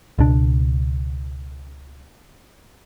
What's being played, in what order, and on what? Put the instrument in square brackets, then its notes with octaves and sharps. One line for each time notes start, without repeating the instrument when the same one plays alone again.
[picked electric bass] C#2 B2 D4